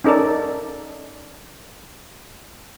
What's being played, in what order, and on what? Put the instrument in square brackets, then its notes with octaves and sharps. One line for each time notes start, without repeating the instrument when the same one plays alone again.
[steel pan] C#4 D#4 A4 A#4 D5